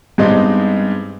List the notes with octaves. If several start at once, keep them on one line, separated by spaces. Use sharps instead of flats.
G2 G3 G#3 B3 C4 D#4